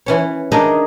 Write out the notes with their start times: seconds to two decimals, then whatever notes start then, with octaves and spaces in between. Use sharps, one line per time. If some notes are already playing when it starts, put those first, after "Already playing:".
0.06 E3 C#4 C#5
0.52 D4 D#4 G#4 A#4 D#5